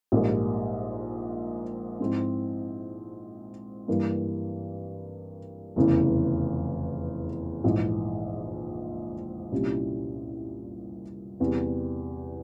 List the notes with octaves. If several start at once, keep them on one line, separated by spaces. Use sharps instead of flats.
A#1 G#2 G3 A#3
G#2 F3 C4 E4
G2 E3 A#3
F1 E2 C#3 E3
A#1 G#2 E3
C2 A#2 G3 C#4 E4
E2 C3 G3